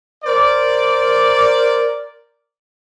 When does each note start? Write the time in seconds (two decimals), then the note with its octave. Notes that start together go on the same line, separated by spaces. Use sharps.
0.24 A#4 C5 D5